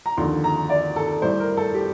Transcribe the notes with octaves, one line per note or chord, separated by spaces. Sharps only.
A#5
D#2 D3 F3 C6
A#5
D5
A4
A2 G3 C5
A#4
A4
G4